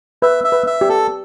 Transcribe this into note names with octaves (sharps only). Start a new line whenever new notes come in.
B4 E5
E5
B4
E5
G4
A4